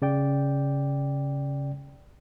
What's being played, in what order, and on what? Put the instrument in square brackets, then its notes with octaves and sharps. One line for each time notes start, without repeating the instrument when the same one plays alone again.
[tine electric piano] C#3 D5 G5